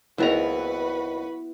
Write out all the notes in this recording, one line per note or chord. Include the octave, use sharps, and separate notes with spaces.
G#1 C#2 B3 E4 F#4 B4 A#5